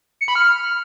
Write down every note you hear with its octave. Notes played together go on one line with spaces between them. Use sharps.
C#7
B5
F6